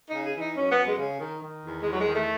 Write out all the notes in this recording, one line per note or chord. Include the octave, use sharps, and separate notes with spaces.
C#3 D#4
G#4
E3
D#4
F#2 C#4
B3
F#2
G#3
C#3
D#3
D#3
E2
E2 G#3
F#3
D#3 G#3
A3